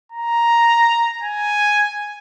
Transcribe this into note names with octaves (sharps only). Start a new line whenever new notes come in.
A#5
G#5